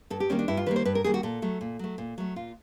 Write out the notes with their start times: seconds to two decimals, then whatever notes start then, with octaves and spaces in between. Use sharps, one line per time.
0.10 G2 A4
0.20 G4
0.29 D#3 G3 A#3 C#4
0.39 D4
0.48 G2 E4
0.57 F4
0.66 D#3 G3 A#3 B4
0.76 C5
0.85 G2 B4
0.95 A#4
1.04 D#3 G3 A#3 G#4
1.14 F#4
1.23 A#2 A4
1.42 F#3 A3
1.61 A#2
1.79 F#3 A3
1.98 A#2
2.18 F#3 A3
2.36 A#2 F4